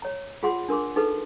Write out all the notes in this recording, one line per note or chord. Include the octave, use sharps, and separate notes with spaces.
C#5 A#5
F4 G#4 F#5 C6
D4 A#4 C6 D6
D#4 F#4 G#4 A4 B4